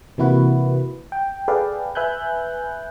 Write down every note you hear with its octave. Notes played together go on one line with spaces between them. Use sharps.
C3 E3 A#3 E4 F#4 B4
G5
G#4 A4 B4 D5 F5 G5
B4 E5 G#5 F#6 G6